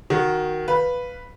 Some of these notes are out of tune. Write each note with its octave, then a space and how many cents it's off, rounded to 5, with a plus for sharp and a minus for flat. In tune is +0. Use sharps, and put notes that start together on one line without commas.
D#3 +0 F#4 +0
B4 +0 F5 +0